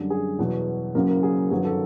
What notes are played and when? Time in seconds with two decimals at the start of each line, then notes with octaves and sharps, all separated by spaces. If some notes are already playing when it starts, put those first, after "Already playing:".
Already playing: F#2 D3 G3
0.10 G#4
0.39 E2 B2 F#3
0.95 F#1 F#2 C#3 F#3 A#3 A#4
1.09 A#4
1.23 G#4
1.50 G1 F#2 D#3 F#3 G#4
1.65 A4